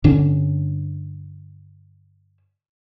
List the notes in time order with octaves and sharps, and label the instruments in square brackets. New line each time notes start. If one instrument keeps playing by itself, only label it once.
[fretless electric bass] G2 D3 C#4